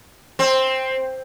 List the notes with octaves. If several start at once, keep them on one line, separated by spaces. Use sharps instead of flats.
C4